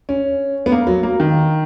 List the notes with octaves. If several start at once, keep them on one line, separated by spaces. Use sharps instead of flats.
C#4
B3
A#3
F#3
A#3
D#3